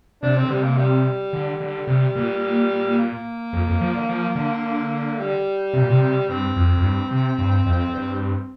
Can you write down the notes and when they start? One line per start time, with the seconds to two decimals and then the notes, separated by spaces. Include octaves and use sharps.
0.22 C3 D4
0.36 C4
0.44 D3
0.50 C3 G3
0.64 A#3
0.77 G3
1.33 D3
1.60 D3
1.87 C3
2.15 A#2
2.98 A#3
3.53 F2
3.67 F2
3.81 F3
3.95 D3
4.08 F3
4.35 D3
5.19 G3
5.73 C3
5.82 A#2
5.90 C3
6.28 G2 C4
6.56 F2
6.77 F2
6.83 G2
7.11 C3
7.39 G2
7.66 F2
7.94 G2